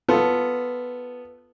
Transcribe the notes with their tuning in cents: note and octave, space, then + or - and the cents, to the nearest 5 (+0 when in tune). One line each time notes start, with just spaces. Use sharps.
B3 +0 F4 +0 A4 +0